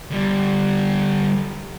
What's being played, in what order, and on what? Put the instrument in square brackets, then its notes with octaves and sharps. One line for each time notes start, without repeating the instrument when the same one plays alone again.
[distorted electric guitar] D3 G3